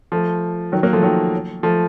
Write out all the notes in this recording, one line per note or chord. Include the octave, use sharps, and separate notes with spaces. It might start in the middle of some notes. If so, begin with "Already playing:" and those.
F3 A3
D#3 F#3
F#3 A#3
F3 A3
D#3 F#3
F3 A3